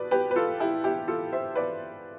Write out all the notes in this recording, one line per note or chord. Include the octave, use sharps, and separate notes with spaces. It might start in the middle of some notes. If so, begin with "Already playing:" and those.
Already playing: B2 B4 D5
G4 B4
B4
F4 A4
E4 G4
E4 G4
F4 A4
C5 E5
B4 D5